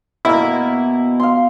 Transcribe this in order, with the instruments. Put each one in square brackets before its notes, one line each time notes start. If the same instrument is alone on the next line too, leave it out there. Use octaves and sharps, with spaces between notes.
[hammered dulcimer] B2 [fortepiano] A#3 E4
[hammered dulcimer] F5 C6